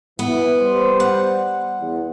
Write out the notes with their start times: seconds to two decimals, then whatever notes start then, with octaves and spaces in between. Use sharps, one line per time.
0.19 E3 B3
0.60 G3 C5
1.00 F#5
1.80 E2